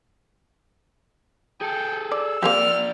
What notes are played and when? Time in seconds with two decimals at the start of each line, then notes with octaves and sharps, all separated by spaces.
1.61 G#4 A4 G5
2.12 D5 E6
2.43 F3 A#3 C4 G4 D5 F6